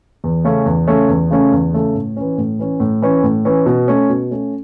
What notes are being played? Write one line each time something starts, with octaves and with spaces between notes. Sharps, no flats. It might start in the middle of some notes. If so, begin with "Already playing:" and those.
E2
C#3 A3 C#4
E2
C#3 A3 C#4
E2
C#3 A3 C#4
E2
C#3 A3 C#4
A2
E3 C#4
A2
E3 C#4
A2
E3 C#4
A2
E3 C#4
B2
A3 C#4
B2
A3 C#4